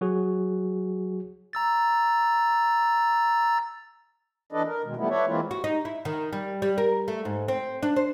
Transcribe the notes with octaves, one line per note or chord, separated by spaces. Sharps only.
F#3 F#4 G#4
A#5 E6 A6
E3 D4 A4 B4 D5 D#5
A#4
B2 D#3 G#3
E3 F3 G3 A3 B3 E4
A4 B4 C#5 D5 E5
E3 G#3 A#3 C4 E4 F4
F#4
D#4
E4
D#3
G3
G3
A#4
A3
G#2
C4
D4
C5